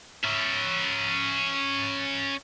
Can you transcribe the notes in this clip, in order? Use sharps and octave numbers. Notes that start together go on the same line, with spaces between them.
C#4 E5